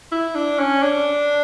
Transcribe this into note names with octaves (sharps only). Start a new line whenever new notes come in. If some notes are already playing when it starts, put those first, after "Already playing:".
E4
D4
C#4
D4